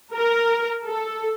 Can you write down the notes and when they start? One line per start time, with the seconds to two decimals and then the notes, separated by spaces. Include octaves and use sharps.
0.15 A#4
0.85 A4